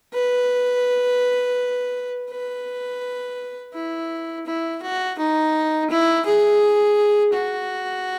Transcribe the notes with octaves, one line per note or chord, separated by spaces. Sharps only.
B4
B4
E4
E4
F#4
D#4
E4
G#4
F#4